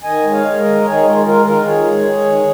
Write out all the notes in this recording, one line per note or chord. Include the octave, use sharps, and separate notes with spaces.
D#3 D#5 G#5
G#3
C#5 F5
G#3
A#4 D#5
D#3
D#3 G#4 C#5
G#3 F4 A#4
G#3 F4 A#4
D#3 F4 A#4
D#3 G#4 C#5
G#3
G#3
D#3